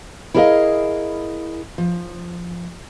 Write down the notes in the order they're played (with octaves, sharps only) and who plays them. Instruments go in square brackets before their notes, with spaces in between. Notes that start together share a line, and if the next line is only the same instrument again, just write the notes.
[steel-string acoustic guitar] E4 G#4 A#4 C#5 D#5 F5
F3